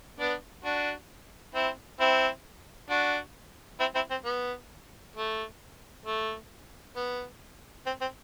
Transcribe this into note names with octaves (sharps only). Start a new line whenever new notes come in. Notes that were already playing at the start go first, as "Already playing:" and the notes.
B3 D4
D4 F#4
C4 E4
C4 E4
D4 F#4
C4 E4
C4 E4
C4
B3
A3
A3
B3
C4
C4